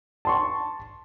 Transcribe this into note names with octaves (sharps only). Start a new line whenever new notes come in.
A5 C6 C#6